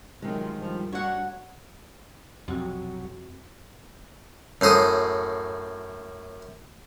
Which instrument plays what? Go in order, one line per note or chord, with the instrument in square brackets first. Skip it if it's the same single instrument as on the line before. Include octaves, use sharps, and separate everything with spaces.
[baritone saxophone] C3 [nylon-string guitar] D#3 G#3 [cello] F#3 F4
[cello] G2 G3 [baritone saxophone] F3
[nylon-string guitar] D4 [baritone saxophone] F#4 [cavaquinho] C#5 F#5
[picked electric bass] B1 C3 [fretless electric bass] F2 [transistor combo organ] F#3 [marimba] C4 F#4
[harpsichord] F#2 A2 C5 D#6